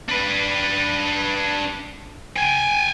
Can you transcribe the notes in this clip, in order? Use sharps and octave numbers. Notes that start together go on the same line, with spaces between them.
D4 B4
G5 G#5